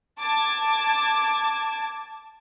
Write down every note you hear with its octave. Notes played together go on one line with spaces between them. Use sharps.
A5 D6 G#6